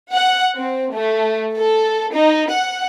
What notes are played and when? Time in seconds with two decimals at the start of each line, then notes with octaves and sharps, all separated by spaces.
0.13 F#5
0.58 C4
0.96 A3
1.57 A4
2.12 D#4
2.51 F#5